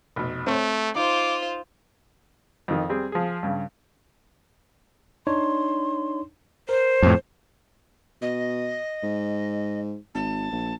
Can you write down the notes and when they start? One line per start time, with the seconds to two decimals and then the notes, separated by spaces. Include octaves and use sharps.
0.16 F1 B2
0.47 A3 C4 C5 C#5
0.96 D#4 F4 C5 D6
2.68 F2 D#3
2.89 G3 C4 G#4
3.12 F3 G#4
3.43 G2 C#3
5.27 D4 D#4 C#5 C6
6.69 A#4 C5
7.02 F2 A2
8.21 B2 D#5
9.03 G#2
10.14 G#1 A5
10.52 A#1